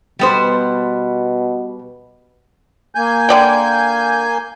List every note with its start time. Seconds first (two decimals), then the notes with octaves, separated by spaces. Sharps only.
0.19 B2 G3 B3 C5
2.95 A#3 G#5 G6
3.29 D3 D5 G5